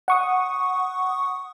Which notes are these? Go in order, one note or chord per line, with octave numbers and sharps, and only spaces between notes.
F#5 C#6 D#6